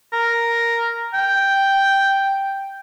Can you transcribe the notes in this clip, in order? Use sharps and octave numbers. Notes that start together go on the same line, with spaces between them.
A#4
G5